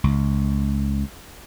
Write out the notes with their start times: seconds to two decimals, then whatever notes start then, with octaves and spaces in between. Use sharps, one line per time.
0.04 C#2